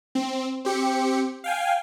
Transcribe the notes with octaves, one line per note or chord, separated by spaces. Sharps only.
C4
C4 G4 C#7
F5 G5 G#5